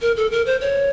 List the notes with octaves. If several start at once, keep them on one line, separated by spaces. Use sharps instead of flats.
A#4
A4
A#4
C5
C#5